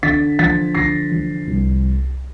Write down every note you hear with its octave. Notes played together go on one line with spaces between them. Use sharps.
D3 A6 B6
F3 A6 B6
D3 A#6 C7
F3
C2